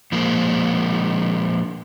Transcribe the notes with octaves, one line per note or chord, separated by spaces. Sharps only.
A#2 F3 G#3 A#3